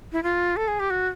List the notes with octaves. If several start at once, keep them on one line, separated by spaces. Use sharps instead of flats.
E4
F4
A4
G#4
G4
F#4